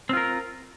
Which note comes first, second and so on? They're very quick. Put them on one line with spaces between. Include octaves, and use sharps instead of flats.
C4 F4 A#4